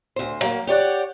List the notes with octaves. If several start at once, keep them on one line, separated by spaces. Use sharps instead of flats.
D2 C5
F#3 A#3
G4 C#5 D5 F#5